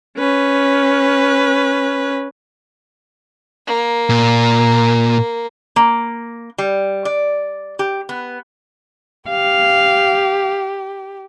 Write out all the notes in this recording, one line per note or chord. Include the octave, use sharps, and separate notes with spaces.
C#4 B4
A#3
A#2
A#3
G3
D5
G4
B3
G4 F5